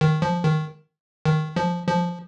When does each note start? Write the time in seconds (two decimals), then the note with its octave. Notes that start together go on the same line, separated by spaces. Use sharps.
0.01 D#3
0.22 F3
0.43 D#3
1.25 D#3
1.56 F3
1.87 F3